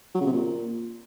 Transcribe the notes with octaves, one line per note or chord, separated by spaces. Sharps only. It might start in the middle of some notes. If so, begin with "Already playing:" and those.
F#3
C#3
C3
A#2